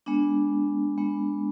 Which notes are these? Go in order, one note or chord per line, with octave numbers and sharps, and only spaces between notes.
G#3 B3 D4
G#3 B3 D4